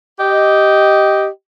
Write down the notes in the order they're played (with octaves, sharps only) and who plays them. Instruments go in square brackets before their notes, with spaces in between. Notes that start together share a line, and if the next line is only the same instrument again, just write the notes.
[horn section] G4 D#5